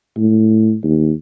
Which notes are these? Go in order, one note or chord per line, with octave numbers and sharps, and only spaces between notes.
A2
D#2